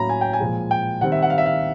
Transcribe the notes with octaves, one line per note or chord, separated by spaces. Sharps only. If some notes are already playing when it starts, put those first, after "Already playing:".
Already playing: A2 F#3 A#3 C#4 A#5 B5
G#5
G5
G#5
A#2 F3 G#3
G5
D#3 G3 C4 F#5
E5
F#5
F5
E5
F5